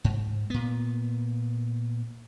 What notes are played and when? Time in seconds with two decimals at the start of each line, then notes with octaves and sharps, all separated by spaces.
0.04 G#2
0.50 A#2 B3